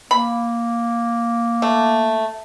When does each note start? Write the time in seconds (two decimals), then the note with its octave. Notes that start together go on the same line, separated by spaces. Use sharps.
0.11 A#3 B5
1.62 A3